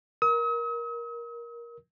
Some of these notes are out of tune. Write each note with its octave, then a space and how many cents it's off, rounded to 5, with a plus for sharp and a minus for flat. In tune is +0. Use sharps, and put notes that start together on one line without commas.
A#4 +15 D#6 +45